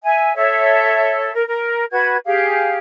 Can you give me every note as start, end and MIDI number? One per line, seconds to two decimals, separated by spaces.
0.03 0.34 76
0.03 0.34 80
0.35 1.31 69
0.35 1.31 73
0.35 1.31 76
1.34 1.43 70
1.47 1.83 70
1.91 2.15 66
1.91 2.15 71
1.91 2.15 92
2.25 2.78 67
2.25 2.78 68
2.25 2.78 77